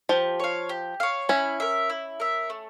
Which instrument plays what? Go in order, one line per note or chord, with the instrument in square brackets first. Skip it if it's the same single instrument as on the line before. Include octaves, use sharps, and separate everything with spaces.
[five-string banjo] F3 [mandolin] G4
[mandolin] C#5 F5
G4
C#5 F5
[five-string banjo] C#4 [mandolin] E4
[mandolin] A#4 E5
E4
A#4 E5
A3